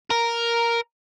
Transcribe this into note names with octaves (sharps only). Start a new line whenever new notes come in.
A#4